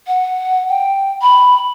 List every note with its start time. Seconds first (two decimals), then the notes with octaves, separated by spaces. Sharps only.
0.08 F#5
0.69 G5
1.22 B5